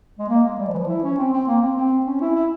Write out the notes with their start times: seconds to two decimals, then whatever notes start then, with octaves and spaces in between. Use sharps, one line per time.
0.19 G#3
0.29 A#3
0.43 G#3
0.58 G3
0.68 F3
0.73 E3
0.78 F3
0.88 E4
1.03 C#4
1.18 C4
1.33 C4
1.48 A#3
1.62 C4
1.77 C4
2.06 C#4
2.21 E4
2.35 E4